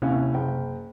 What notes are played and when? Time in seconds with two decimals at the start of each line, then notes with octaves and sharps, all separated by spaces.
0.02 D#2 C3 C#4 E4
0.34 F#1 G5